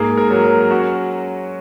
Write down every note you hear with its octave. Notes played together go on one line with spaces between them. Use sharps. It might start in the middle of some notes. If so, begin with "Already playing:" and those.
Already playing: G#2 A#3 G#4
A#4
F#3
A#4
C#4 F#4